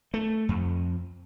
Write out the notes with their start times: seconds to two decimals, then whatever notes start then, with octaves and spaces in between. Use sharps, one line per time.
0.14 A3
0.49 F2